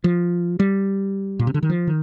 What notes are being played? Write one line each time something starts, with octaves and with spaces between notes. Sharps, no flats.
F3
G3
A#2
C3
D3
D#3
F3
D#3